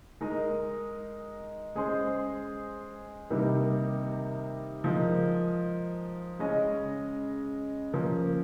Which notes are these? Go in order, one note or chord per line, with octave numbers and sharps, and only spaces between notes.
G#3 D#4 A#4 D#5
G#3 C#4 G#4 C5 D#5
C3 D#3 G3 A#3 D#4
F3 G#3 D#4 A#4
C#3 G#3 C#4 G#4 D#5
F3 A#3 C#4